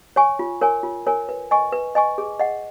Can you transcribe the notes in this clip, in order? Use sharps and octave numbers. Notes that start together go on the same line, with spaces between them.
C#5 G#5 C#6
F4
A#4 C#5 G#5
F4
A#4 C#5 G#5
B4
D#5 G#5 C#6
B4
D#5 G#5 C#6
G#4
D#5 F#5